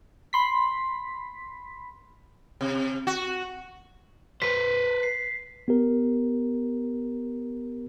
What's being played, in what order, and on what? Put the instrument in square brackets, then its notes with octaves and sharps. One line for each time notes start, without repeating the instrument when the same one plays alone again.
[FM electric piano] B5 C6 B6
[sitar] C3
F#4
[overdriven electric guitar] B4 C5 [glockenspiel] B6
[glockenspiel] C7
[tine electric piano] B3 G4 A#4